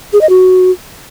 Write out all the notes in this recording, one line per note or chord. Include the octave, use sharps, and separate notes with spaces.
G#4
D#5
F#4